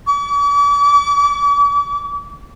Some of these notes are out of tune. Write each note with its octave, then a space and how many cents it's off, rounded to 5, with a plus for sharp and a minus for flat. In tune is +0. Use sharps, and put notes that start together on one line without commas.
D6 -45